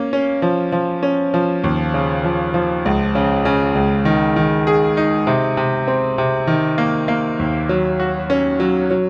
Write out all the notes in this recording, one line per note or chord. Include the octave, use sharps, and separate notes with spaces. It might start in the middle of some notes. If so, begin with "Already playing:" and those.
Already playing: A#3 C#4
C#4
F3
F3
C#4
F3
D#2
C#3
F3
F3
C#2
C#3
C#3
C#2
D#3
D#3
G#4
D#4
C3
C3
C4
C3
D#3
A#3
A#3
D#2
F#3
F#4
C#4
F#3
F#3